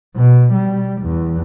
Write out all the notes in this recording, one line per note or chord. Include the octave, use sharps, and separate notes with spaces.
B2
G3
E2